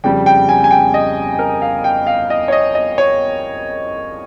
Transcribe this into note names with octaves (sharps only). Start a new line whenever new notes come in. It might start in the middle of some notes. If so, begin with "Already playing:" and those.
F2 C#3 G3 G5
G5
G#5
G#5
G5
D#5
A#4
F5
G5
F5
D#5
C#5
D#5
D#5
C#5